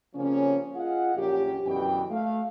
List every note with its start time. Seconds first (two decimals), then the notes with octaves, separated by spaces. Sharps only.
0.15 C#3 F3 G3 A#3 C4 C#4
0.75 F4 G#4 D#5 F5 F#5
1.16 A#1 F#2 C#3 C#4 G4
1.66 F#2 B2 D3 E3 F#4 G5
2.11 A3 F5